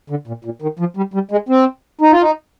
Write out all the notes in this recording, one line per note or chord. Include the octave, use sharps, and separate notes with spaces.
D3
A#2
A#2
D#3
F3
G3
G3
G#3
C4
D#4
F4
D#4